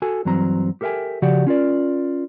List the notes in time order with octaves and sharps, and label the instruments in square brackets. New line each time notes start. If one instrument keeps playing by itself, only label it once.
[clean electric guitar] F#4 A4 G#5
G2 E3 F#3 C4 A#5
G4 A4 A#4 E5 G5 G#5
C#3 F3 F#4 G4 D5 F#5
C#4 F4 A#4 D5